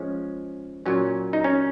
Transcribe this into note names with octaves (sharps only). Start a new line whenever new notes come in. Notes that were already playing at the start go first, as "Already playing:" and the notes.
Already playing: F3 G#3 C#4
A#2 F#3 C#4
D#4
C#4